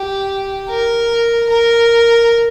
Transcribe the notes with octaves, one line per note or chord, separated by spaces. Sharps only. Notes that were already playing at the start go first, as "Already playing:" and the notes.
Already playing: G4
A#4
A#4